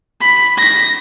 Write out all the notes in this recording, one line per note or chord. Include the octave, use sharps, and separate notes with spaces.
B5
A#6